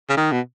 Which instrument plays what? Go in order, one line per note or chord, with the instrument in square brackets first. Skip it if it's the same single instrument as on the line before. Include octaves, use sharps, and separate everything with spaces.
[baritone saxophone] C#3
D#3
B2